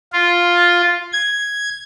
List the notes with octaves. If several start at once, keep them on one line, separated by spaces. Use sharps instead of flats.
F4
G#6